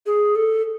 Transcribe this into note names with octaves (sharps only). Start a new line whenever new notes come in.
G#4
A4